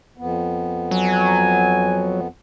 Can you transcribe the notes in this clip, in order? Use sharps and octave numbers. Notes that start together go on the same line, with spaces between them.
F2 B3
F#3 G#5